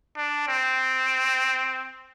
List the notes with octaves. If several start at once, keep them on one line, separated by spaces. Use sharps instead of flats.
D4
C4